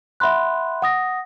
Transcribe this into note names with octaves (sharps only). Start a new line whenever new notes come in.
E5 F#5 B5 C6 F#6
F#5 D#6 A#6